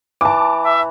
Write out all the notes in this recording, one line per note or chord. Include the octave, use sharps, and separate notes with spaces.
E3 A5 D6
E5